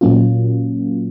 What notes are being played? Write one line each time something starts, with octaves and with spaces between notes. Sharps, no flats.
A#2 F#3 A#3 C#4 F4